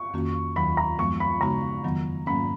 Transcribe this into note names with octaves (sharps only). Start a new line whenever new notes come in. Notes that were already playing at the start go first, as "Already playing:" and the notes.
Already playing: C#6
F2 D#3 A#3 C#4 F#4
D#2 D#3 F#3 B5
A#5
F#2 F3 G#3 B3 C#6
B5
C#3 G#3 B3 D#4 F#4 A#5
F2 D#3 F#3 B3
G#2 F#3 A#3 C#4 B5